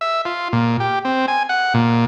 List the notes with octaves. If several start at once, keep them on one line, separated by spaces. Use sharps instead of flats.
E5
F4
A#2
G4
C4
G#5
F#5
A#2